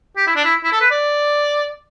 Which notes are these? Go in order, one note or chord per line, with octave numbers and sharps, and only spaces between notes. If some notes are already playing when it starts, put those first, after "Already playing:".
G4
E4
D4
E4
E4
A4
B4
D5